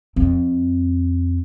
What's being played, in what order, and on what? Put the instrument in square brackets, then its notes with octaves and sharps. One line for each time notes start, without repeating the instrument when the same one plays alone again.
[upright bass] F2 C4